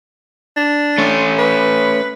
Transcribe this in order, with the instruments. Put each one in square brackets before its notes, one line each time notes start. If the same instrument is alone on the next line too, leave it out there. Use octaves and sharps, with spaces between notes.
[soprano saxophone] D4
[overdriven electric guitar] A3 C#4
[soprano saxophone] B4